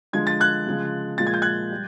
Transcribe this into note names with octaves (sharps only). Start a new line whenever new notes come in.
D3 F3 G#3 G#6
A6
F#6 G#6
C#3 F3 G#3
A#2 F3 G#3 A6
G#6
G6
F#6 G#6
G3